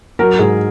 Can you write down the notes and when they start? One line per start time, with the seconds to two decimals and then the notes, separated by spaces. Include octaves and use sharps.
0.19 F#3 A#4
0.39 G#2 G#4